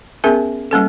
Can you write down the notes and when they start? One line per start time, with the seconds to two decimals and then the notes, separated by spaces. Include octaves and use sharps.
0.24 B3 C#4 G#4 A#4 E5
0.71 G3 A#3 C#4 A4